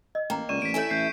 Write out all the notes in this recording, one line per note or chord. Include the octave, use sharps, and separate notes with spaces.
D#5
A1 A#3 G5 A#5
C#2 D5 C#6 D#7 E7
A1 B6 D7
E4 A4 C#5 E5 G#5
A1 G6 B6 C7